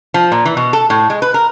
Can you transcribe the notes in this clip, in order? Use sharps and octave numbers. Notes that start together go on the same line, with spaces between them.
F3
A#2
E3
B2
A4
A2
G#3
B4
A#4